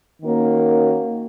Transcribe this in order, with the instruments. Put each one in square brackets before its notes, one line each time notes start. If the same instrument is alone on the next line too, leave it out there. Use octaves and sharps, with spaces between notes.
[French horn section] D#3 A#3 C#4 F#4 A#4